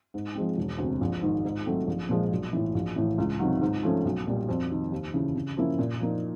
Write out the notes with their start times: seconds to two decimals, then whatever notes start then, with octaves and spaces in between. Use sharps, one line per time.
0.14 G#2
0.35 F3 G#3 C4
0.57 E1
0.78 D2 C3
1.01 A#1
1.22 G#2 D#3
1.45 G#2
1.66 D#3 F#3 A3 C4
1.87 A#1
2.09 A#2 F3 G#3
2.31 B1
2.53 A2 E3
2.75 A#1
2.96 A2 E3
3.18 C#2
3.39 C3 D#3 F#3
3.62 G#2
3.83 F3 A3 C#4
4.05 B1
4.27 A#2 G3
4.49 F2
4.70 C3 D#3
4.92 D#2
5.14 C#3 E3
5.35 C#3
5.57 F3 A#3 C#4 E4
5.79 A#2
6.00 F3 A#3 D#4